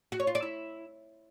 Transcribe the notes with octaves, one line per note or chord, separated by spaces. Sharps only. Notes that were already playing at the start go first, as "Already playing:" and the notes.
F#4
C#5
F4
D5
E4